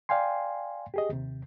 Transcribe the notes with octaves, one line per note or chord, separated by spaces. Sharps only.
D5 F5 G5 G#5 C6
G4 G#4 D#5
D#2 C3